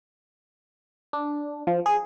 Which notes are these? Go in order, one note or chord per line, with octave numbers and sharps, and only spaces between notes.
D4
F3
G#4